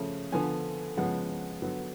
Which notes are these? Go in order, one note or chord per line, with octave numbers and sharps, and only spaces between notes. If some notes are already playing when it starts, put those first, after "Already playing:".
Already playing: C#3 F3 A3
D3 F3 B3 G#5
C#3 F3 G#3 B3 F#5
D3 F#3 B3